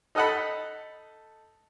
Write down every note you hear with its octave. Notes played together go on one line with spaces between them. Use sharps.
D#4 A4 D#5 F#5 A5 B5